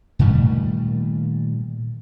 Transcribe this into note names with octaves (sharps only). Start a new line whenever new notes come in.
A#2 D#3 G3 A3